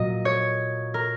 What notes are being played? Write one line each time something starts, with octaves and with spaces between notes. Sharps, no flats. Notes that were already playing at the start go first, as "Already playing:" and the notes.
Already playing: A#2 F#3 A#3 D#5
C#5
A#4